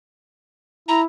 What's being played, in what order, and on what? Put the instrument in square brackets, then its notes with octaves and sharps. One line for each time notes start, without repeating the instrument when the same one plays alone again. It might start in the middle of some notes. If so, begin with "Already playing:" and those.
[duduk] E4 [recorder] A#5